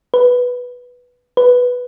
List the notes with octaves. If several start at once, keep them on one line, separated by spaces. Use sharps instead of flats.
B4
B4